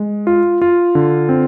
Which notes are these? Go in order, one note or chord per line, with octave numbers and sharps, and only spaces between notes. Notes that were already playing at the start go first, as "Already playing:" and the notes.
Already playing: G#3
F4
F4
D3
C4